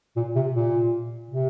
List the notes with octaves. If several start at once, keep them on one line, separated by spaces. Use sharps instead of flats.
A#2
C3
A#2
C3